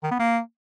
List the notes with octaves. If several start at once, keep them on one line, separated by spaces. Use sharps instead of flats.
D#3
B3
A#3